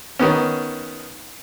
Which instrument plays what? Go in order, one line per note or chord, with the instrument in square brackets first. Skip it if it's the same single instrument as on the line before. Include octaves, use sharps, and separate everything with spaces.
[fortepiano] D#3 B3 C#4